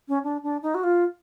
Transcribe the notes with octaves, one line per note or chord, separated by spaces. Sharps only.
C#4
D4
D4
D#4
F#4
F4